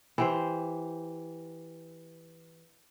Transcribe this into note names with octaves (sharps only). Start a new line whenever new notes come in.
E3 G4 C5